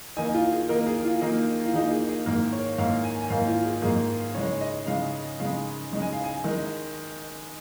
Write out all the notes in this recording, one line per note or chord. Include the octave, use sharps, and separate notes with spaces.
D#3 A#3 D#4 G#5
F4
G#4
D#3 A#3 D#4 A#4
G#4
F4
D#3 A#3 D#4
F4
D#3 A#3 D#4 G#4
G#4
G#4
G#2 D#3 A#3 A#4
C#5
G#2 D#3 A#3 F5
G#5
G#5
G#2 D#3 A#3 F5
F4
G#4
G#2 D#3 A#3 G#4
C#3 G#3 D#4 C#5
D#5
C#3 G#3 D#4 F5
C#3 G#3 D#4 F5
C#3 G#3 D#4
G#5
F5
G#5
D#3 G#3 D#4